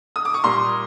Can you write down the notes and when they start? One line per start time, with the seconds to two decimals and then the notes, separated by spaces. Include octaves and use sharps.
0.16 D#6
0.25 D6
0.34 C#6
0.44 A#2 G3 A#5 C6